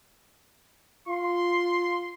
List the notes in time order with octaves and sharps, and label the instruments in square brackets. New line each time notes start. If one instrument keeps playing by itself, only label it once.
[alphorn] F4 [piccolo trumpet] C6